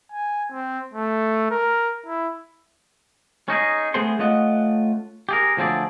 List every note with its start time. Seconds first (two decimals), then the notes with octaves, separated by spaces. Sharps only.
0.12 G#5
0.51 C4
0.94 A3
1.51 A#4
2.06 E4
3.48 C#4 D#4 F#4 G#4
3.94 A3 B3 C4 G#4 C5 C6
4.19 A3 C#4 F4 D#5 F#5
5.29 G4 G#4 A#4
5.57 D2 F3 F#3 C4 G#4 D5